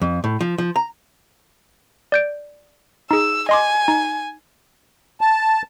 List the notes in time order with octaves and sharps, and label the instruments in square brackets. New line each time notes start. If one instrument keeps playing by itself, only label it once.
[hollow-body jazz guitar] F2
A2
F3
F3
A#5
[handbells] D5 G6 D7
[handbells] D#4 G#4 [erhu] E6
[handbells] D#5 C6 D6 [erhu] G#5
[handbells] D#4
[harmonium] A5